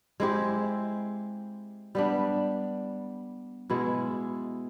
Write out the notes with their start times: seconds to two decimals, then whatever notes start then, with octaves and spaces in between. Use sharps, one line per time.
0.20 G#3 C4 E4 G4
1.95 G3 B3 D4
3.70 B2 G#3 B3 E4